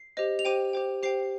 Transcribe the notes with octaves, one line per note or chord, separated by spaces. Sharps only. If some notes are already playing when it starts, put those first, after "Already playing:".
Already playing: C7
G4 C5 D#5
F7
G4 C5 G5 D#7
G4 C5 G5
G4 C5 G5 C7